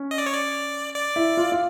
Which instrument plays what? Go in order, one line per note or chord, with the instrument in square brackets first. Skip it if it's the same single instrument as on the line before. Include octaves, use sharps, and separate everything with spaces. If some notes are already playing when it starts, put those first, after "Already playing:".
Already playing: [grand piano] C#4
[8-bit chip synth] D#5
D5
C#5
D5
D5
[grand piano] E4
F4
F4